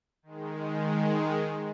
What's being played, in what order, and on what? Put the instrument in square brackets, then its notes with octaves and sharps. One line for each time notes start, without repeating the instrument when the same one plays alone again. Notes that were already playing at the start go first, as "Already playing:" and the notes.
[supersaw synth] D#3 G#3